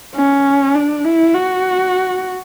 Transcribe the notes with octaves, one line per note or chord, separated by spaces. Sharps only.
C#4
D4
E4
F#4